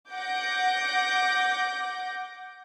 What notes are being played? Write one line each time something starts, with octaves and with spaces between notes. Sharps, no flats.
F#5 D6 G6 A#6